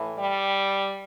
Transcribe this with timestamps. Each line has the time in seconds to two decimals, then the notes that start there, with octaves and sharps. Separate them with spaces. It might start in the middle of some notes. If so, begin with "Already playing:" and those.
Already playing: A2 E3
0.19 G3